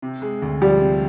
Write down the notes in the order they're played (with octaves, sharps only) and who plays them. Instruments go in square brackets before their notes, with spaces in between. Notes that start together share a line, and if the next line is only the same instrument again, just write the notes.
[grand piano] C3
G#3
D2
[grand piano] F3 [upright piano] G3
[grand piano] C3